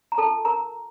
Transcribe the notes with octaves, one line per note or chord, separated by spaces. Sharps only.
A#5
F4 A4 A#4 A5
A#4 A#5